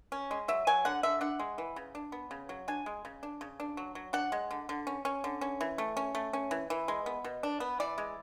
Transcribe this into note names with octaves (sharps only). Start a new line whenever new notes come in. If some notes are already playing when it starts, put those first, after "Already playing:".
C#4
G#3
F#3 E5
F#3 G#5
D3 F#5
D3 E5
D4 F#5
G#3
E3
C#3
D4
B3
C#3
F#3
D4 G#5
G#3
C#3
D4
C#3
D4
F#3
F#3
D4 F#5
G#3
D3
D3
C#4
C#4
D3
C#4
E3
A3
C#4
A3
C#4
E3
E3
G#3
B3
B2
D4
B3
E3 D5
G#3